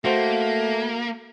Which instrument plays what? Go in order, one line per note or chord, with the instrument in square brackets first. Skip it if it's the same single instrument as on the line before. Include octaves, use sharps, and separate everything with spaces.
[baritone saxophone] A3 [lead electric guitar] A#3 [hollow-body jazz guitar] F#4 C5